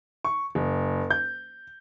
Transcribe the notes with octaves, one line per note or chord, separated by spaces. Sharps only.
C#6
F#1
G6